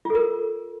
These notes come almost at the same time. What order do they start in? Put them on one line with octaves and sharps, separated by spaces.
F4 A4 A#4